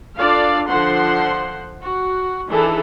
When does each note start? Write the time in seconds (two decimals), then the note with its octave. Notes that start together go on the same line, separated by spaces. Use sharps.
0.17 D4 F4 A4 D5 F5
0.70 D3 F3 C5 F#5 C6
1.82 F#4
2.49 D#3 E3 D4 E4 G#4 A4